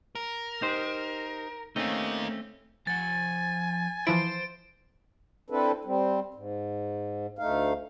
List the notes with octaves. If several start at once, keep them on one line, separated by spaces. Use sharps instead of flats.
A#4
D#4 G4 C5
A3 A#3 C4 C#4 D#4
F3 F#5 G#5 A6
E3 F3 E4 C5 C6 D7
C4 D4 E4 A4 B4
G3 C4
G#2
D2 A3 D#4 F5